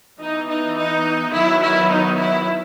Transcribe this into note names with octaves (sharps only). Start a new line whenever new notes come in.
E3 B3 D#4
D#4
D#4
D#3 F#3 B3 E4
E4
D#4
E4